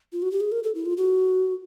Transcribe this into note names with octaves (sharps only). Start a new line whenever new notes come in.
F4
F#4
G4
G#4
A#4
A4
E4
F4
F#4